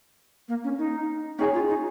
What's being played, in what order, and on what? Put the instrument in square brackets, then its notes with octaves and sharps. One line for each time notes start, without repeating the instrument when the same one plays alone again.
[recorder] A#3
C#4
D#4
[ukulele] C#4 G#4 C#5 G#5 [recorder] D#4
[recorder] F4
D#4